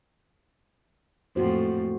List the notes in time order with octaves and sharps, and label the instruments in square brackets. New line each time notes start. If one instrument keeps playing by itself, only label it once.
[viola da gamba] F2 A2 [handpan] A#3 F#4 C5